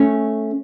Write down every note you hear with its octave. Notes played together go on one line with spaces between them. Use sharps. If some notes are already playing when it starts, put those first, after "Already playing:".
Already playing: A3 C#4